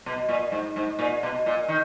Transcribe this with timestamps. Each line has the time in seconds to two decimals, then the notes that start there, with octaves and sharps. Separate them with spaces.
0.06 B2
0.29 A#2
0.52 G#2
0.76 G#2
0.99 A#2
1.23 B2
1.46 A#2
1.69 D#3